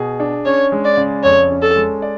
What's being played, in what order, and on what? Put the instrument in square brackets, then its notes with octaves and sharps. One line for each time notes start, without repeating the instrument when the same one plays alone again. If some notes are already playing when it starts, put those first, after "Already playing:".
Already playing: [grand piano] B2 G#4
D4
[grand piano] C#4 [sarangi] C#5
[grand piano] G#3
[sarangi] D5
[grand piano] C#3
[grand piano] F2 [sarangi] C#5
[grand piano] C#4
[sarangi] A4
[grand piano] G#3
D5